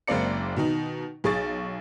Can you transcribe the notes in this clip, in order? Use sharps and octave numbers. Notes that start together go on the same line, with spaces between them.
F#1 G#3 A#3 C4 D5 C#7
B2 D#3 D#4
B1 G#4 C#6 A6